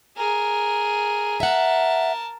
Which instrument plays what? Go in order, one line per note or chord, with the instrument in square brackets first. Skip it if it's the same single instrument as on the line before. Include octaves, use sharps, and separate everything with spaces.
[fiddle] G#4 A#4
[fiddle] A#4 A5 [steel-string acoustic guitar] E5 F#5